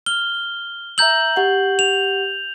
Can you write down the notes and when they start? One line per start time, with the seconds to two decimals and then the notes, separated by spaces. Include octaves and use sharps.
0.06 F6 G7
0.98 E5 A#5 E6 G6 F#7
1.36 G4 F#5
1.79 F7